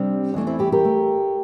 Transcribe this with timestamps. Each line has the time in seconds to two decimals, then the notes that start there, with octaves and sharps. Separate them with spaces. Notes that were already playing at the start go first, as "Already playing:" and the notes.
Already playing: C3 G3 C4 D4
0.34 E2 E3 A3 D4
0.47 C4 E4
0.59 E4 G4
0.72 G4 A#4
0.85 A3